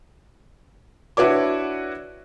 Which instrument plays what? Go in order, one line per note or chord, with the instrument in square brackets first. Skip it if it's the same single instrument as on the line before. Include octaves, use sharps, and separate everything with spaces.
[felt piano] D4 E4 F#4 B4 C#5 D6